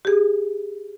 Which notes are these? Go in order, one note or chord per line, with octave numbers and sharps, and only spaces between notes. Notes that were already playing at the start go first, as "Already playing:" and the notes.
G4 G#4